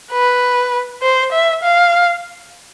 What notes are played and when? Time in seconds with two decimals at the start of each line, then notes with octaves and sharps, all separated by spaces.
0.12 B4
1.02 C5
1.32 E5
1.63 F5